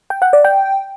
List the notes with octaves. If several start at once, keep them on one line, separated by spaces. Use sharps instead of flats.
G5
F#5
D5
G5